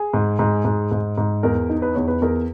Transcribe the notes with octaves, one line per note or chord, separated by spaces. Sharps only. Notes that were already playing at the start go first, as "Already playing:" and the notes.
Already playing: G#4
G#2
G#2
G#2
G#2
G#2
E2 A#4
D#4
B4
E2 C#5
B4
E2 A#4